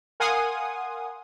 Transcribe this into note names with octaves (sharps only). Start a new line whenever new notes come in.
A#4 F5 F#5 G#5 C6 D#6